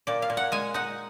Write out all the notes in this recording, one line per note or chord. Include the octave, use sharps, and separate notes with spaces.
A#2 D5
F5
A#2
F#5
G#3 G#5
D#4 F#5